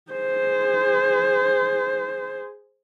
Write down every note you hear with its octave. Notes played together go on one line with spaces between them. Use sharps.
G#4 C5